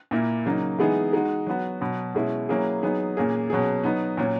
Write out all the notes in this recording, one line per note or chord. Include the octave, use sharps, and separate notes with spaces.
A#2 A#3 E4
C#3 F#3 A#3 D#4
E3 G#3 B3 D#4 G#4
G#3 D#4 F#4
F#3 B3 F#4
B2 F#3 B3 F#4
B2 G#3 C#4 E4
F#3 A#3 C#4 E4 G#4
F#3 B3 D#4 G#4
A#2 A#3 C#4 G#4
B2 F#3 C#4 G#4
F#3 B3 D#4
A#2 F#3 C#4